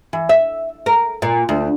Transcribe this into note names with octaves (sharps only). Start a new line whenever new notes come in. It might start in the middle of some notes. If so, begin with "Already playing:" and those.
E3
E5
A#4
A#2
D2